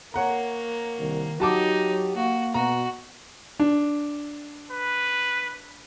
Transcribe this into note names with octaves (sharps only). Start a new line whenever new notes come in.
A#3 C#5 F#5 A#5
C2 D#3
F#3 D#4 F#4 G4 A5 D6
A#3 F#4
B2 F#4 A#5
D4
B4